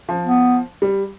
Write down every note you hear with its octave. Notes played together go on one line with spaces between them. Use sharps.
F3
B3
G3